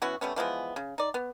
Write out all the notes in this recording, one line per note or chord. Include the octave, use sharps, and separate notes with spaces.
E3 B3 C#4 F#4
G3 A3 B3 C#4
E3 F3 G#3 B3
C#3
D#4 D5
B3